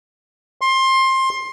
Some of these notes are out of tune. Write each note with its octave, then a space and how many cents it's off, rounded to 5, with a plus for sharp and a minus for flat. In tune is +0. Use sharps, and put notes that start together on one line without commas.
C6 +20